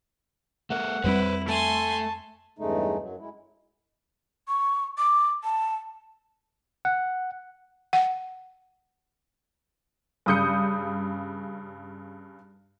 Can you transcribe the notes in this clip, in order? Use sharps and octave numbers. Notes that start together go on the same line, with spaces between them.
A3 A#4 F#5
F2 G3 C4 E4 B4 C5
A3 G#5 A5 C6
E2 G2 C#3 G#3 A3 D#4
F#2 F#3
G#3 E4
C#6
D6
A5
F#5
F#5
G2 C#3 D#6 G6 C#7